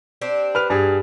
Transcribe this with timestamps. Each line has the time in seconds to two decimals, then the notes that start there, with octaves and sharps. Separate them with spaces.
0.22 C4 D4 G4
0.55 B4 F6 F7
0.70 G2 G3 G#4